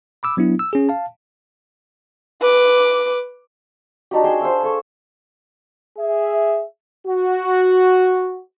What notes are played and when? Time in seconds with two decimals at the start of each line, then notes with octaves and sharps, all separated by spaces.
0.23 B5 D6 E6
0.37 F#3 B3 D4 E4
0.59 E6
0.73 C#4 G#4
0.89 F5 A5
2.41 B4 D6
4.11 D4 D#4 F#4 G4
4.24 G#4 G5 C6 E6
4.41 C5 F5 E6
4.63 A4 C#6
5.98 G#4 E5
7.07 F#4